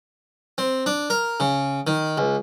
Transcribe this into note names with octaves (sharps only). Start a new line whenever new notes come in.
C4
D4
A#4
C#3
D#3
C#2